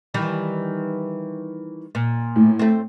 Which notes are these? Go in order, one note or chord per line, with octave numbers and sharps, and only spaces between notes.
D#3 E3 G3
A#2
A2
A3 C4